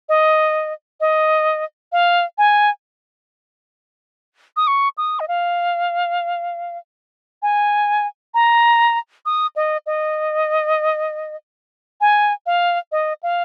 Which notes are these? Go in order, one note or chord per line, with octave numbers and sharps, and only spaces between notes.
D#5
D#5
F5
G#5
D#6
C#6
D#6
D#5
F5
G#5
A#5
D#6
D#5
D#5
G#5
F5
D#5
F5